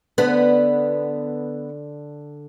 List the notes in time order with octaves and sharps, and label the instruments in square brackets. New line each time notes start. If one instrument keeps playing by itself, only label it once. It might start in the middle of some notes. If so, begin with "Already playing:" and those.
[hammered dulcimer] D3 [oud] B3